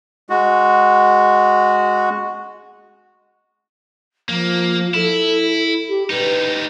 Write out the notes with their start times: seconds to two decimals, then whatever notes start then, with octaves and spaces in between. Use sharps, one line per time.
0.30 G#3 F#4
4.29 F3 A#3
4.94 E4 A4
5.88 G4
6.10 G3 D#4 B4